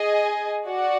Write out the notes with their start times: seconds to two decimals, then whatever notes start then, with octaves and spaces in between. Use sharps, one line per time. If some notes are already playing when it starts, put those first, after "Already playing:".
Already playing: G#4 D#5 G#5
0.65 F#4 D5 F#5